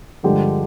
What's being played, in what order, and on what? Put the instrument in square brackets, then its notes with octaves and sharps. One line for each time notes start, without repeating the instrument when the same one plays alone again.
[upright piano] G2 D3 F3 G#3 G4